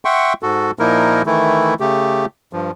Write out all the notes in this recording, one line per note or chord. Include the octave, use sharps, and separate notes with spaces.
E5 F#5 G5 C6 C#6
G#2 F#4 A4
A#2 F3 A#3 D#4 E4 A#4
D#3 E3 A3 E4
C#3 A3 G4
G2 F3